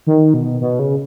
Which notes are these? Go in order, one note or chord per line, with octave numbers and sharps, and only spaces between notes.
D#3
B2
B2
C#3